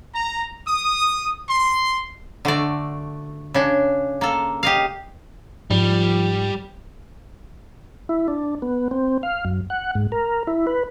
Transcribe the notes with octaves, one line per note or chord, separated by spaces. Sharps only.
A#5
D#6
C6
D3 A3 F#4 D5
C#3 D4
A#3 A4
G4 D#5 F5
G#2 F3 G3
E4
D4
B3
C4
F5
F#2
F#5
G#2
A#4
E4
B4